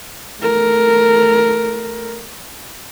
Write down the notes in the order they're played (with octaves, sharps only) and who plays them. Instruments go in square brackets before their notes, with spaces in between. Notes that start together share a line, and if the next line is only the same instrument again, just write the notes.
[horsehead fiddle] A3 A#4